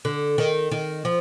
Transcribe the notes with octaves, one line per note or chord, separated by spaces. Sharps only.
D3
D#3
D#3
F3